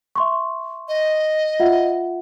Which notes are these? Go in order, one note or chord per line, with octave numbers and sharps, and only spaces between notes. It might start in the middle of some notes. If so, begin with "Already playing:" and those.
E5 C6 C#6
D#5
F4 E5 F#5